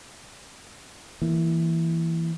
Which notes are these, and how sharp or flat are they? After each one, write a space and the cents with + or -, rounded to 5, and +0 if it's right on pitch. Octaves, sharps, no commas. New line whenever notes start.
E3 +0 A#3 +0